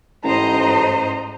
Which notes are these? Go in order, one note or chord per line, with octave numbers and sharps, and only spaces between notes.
A1 G#2 C5 D#5 A#5